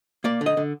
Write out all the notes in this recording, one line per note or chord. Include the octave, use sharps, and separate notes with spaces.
A#3 D5
D3
D#5
D3